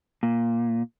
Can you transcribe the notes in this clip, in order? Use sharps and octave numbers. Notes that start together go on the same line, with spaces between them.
A#2